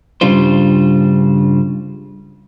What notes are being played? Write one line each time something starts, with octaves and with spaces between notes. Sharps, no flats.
G2 C#3 G3 D4 F4 C5